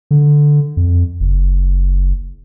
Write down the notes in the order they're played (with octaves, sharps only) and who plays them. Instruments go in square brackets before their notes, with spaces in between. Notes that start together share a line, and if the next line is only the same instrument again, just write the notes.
[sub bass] D3
F2
F#1